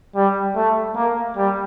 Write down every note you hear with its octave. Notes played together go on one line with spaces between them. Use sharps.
G3
A3
A#3
G3